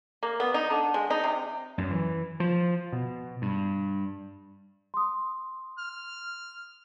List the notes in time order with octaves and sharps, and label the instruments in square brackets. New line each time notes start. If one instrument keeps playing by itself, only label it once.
[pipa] A#3
B3
D#4
D3
G#3
D#4
C3
[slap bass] F#2
E3
F3
B2
G2
[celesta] C6 D#6
[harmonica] F6